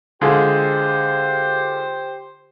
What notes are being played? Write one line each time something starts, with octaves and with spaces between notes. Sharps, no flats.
D3 G#3 F4 G4 C5